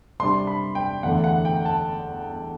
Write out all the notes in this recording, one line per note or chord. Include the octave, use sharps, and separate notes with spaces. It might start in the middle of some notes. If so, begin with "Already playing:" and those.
C3 G3 D4 C6
B5
G5
E2 D3 A3 F#5
F#5
G5
A5